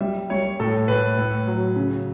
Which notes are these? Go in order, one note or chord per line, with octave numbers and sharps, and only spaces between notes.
G3 E5
G3 C#5
A2 A4
A2 B4
A2
F#3
C#3